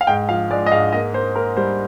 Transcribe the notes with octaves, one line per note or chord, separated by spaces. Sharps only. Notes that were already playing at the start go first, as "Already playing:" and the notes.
F5
G#2 G5
F3 F5
G#3 D5
D#5
G#2 F5
A#3 D#5
A#3 C5
A#3 A#4
G3 C5